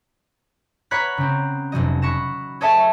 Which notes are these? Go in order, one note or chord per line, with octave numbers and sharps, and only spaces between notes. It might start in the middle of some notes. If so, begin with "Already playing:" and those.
C#5 F#5 A#5 B5 F#6 B6
C#3 C4
F1 C3 F#3 D#5
B5 C#6 F#6 A#6 E7
G#4 A4 C#5 D#5 E5 A5